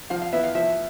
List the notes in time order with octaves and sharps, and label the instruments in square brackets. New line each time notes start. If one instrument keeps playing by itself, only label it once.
[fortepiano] F3 [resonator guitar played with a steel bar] F5
[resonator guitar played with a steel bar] F5
[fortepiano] B3 E4 [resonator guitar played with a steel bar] E5
[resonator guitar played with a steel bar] F5
[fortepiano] F3 [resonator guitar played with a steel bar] E5